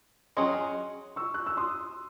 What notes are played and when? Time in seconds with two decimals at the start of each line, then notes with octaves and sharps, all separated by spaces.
0.37 F#3 C#4 G#4 D#5 C6 D#6
1.16 C#6 E6
1.34 F#6
1.46 E6
1.57 C6 D#6